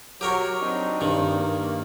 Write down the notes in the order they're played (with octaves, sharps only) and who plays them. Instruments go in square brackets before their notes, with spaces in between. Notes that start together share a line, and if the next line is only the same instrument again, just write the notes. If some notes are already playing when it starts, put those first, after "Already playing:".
[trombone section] F#3 [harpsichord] G4 A#4 C#5
[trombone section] C4 D4 D#4
[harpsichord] G2 D#3
[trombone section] A#3